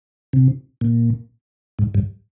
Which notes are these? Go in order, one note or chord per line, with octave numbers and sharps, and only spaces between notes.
C3
A#2
G#2
G2